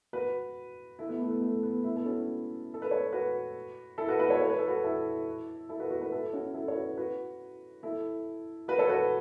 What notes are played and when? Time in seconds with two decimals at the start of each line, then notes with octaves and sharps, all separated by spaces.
0.13 F#4 B4
0.99 E4 A4
1.09 B3 E4
1.20 A3
1.30 B3
1.42 A3
1.63 B3
1.84 B3 E4
1.96 A4
2.06 C#4 F#4
2.74 A4
2.82 B4
2.91 A4 C#5
3.12 F#4 B4
3.98 E4 A4
4.08 F#4 B4
4.19 F#4 B4
4.30 A4 C#5
4.41 C#5
4.49 B4
4.59 A4
4.68 F#4 B4
4.83 E4 A4
5.69 E4 A4
5.80 F#4 B4
5.91 F#4 B4
6.01 F#4 B4
6.12 E4 A4
6.33 C#4 F#4
6.54 E4 A4
6.68 C#5
6.76 F#4 B4
6.97 F#4 B4
7.83 E4 A4
8.68 F#4 B4
8.78 A4 C#5
8.89 F#4 B4